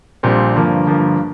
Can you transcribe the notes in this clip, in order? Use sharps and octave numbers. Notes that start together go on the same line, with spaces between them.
A#1 A#2 G3 C4
G1 G2 F3 A#3
G1 G2 F3 A#3